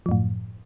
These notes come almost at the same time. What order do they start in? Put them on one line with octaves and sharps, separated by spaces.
F3 F#2 A2